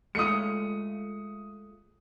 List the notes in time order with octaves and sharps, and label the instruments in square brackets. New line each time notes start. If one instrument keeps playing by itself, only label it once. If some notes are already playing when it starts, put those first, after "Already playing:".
[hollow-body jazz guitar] G#3 A3 F4 [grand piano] D#6 C#7